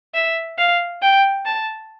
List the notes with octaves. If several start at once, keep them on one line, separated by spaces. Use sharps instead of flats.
E5
F5
G5
A5